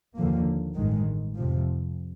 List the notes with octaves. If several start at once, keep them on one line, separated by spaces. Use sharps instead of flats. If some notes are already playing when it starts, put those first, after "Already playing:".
D#2 D3 F3 A#3
A1 G2 D#3 G#3
F2 C3 F3